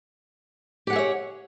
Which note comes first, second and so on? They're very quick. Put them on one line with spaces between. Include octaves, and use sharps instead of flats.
G4 F#5 G#4 E5 C#5